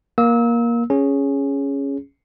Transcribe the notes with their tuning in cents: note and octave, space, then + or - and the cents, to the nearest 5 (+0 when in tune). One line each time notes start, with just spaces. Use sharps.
A#3 +15 E6 -30
C#4 +0 G#4 +0